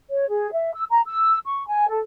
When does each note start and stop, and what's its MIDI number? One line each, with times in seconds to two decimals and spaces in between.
0.10 0.26 73
0.29 0.50 68
0.52 0.72 76
0.73 0.84 88
0.90 1.01 82
1.06 1.38 88
1.45 1.66 85
1.67 1.87 80
1.89 1.99 69